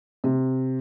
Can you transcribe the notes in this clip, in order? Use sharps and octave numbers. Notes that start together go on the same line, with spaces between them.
C3